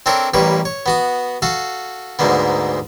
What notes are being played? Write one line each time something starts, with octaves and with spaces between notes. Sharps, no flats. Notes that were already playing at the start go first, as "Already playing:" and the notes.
C4 D4 A4 A#4 C#5
A1 G3 A#3 B4 C#5
C#5
B3 F#4 D#6
F#4 A4 F5
D2 G#2 D3 A#3 B3